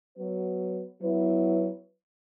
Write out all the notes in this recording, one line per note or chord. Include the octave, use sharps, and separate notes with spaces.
F#3 B3 F#4 B4
F#3 B3 E4 B4